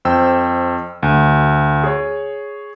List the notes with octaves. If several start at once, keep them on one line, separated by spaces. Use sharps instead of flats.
F2 C5 G5 E6
D2
G#4 C#5